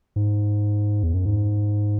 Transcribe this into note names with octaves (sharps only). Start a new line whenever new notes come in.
G#2
E2
F#2
G#2